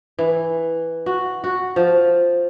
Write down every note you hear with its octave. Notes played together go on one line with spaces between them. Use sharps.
E3
F#4
F#4
F3